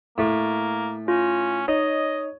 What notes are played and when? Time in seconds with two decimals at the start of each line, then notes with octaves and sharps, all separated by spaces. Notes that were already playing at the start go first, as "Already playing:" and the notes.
0.18 A2 A3 A#3
1.08 C#4 F4
1.68 D#4 C#5 D#5